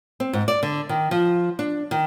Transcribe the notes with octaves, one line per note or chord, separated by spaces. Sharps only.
C4
G#2
D5
D3
D#3
F3
D4
D#3